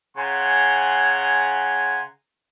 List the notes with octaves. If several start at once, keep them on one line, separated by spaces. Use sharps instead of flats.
C#3 F#5 G#5 A#5 C6